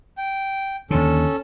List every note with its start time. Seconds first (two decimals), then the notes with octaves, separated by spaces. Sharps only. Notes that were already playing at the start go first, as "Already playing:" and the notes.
0.18 G5
0.91 D#2 D3 C#4 A4